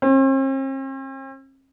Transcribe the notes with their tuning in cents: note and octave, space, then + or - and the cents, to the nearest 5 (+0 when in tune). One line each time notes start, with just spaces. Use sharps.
C4 +45